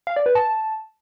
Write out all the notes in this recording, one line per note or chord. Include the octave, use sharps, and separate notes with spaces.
F5
D5
B4
A5